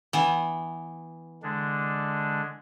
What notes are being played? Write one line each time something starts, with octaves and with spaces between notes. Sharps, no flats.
E3 B3
D3 G#3 D4